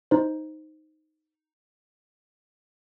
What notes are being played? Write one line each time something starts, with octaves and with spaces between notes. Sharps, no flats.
D#4 C5